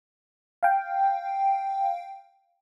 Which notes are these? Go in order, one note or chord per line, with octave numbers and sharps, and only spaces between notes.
F5 G5